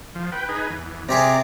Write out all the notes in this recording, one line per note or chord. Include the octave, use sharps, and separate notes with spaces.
F3
B4 G5
D#4 G#4 B4
E2
C3 G4 G#4 D5 A#5